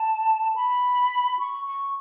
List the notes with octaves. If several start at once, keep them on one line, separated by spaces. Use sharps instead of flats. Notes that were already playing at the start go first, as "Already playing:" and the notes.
Already playing: A5
B5
C#6
C#6